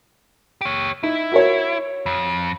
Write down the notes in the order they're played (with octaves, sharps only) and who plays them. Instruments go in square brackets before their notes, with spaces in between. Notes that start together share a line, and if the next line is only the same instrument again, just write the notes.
[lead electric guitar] G4 C#5
[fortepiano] D#4 [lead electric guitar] E4
[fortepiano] F#4 A#4 C#5
[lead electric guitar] F2